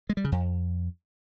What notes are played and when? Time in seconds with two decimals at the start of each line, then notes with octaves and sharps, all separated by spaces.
0.10 G#3
0.17 G3
0.24 C#3
0.32 F2